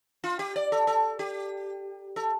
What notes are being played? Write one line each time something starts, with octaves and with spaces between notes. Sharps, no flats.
F4
G4
D5
A4
A4
G4
A4